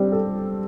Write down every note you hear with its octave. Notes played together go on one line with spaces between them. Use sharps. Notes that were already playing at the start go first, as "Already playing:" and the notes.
Already playing: G3 C4 D4 G4
A4